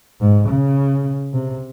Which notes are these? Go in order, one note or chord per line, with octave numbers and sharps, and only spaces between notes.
G#2
C#3
C3